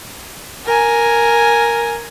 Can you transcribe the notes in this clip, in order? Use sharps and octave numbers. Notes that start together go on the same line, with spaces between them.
A#4 G#5